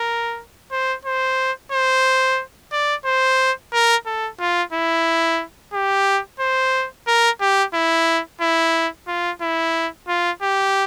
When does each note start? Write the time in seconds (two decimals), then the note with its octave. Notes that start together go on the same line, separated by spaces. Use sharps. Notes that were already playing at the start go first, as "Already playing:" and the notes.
Already playing: A#4
0.72 C5
1.05 C5
1.72 C5
2.72 D5
3.05 C5
3.73 A#4
4.06 A4
4.40 F4
4.73 E4
5.73 G4
6.40 C5
7.07 A#4
7.41 G4
7.74 E4
8.41 E4
9.08 F4
9.41 E4
10.08 F4
10.42 G4